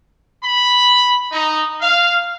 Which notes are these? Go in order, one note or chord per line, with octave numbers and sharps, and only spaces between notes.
B5
D#4
F5